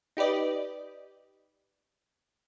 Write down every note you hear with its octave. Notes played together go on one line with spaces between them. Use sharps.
D#4 G4 B4 D5 D#5